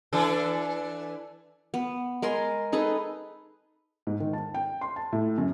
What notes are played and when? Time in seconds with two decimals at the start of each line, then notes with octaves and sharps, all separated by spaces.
0.13 E3 D4 A4
1.74 B3
2.22 G#3 A#4 G#5 C6
2.72 D#4 G#4 A4 B4
4.07 G#2
4.20 D#3
4.33 A5
4.54 G5
4.81 C6
4.96 A5
5.13 A2
5.38 F#2